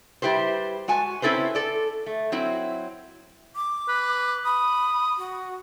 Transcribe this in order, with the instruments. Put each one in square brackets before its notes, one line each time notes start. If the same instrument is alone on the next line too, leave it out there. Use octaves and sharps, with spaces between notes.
[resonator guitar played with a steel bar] G3 E4 G4 B4 C5
G#3 F#4 G#5 A5
C4 C#4 E4 A4 B4 C5
A4 D5
A3
F#3 C4 E4
[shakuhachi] D6
[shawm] B4
[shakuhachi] B5 [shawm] D#6
[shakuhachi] F#4